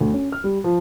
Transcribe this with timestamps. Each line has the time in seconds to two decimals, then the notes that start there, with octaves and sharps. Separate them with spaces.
0.01 D2
0.13 C#4
0.32 F6
0.44 G3
0.64 F3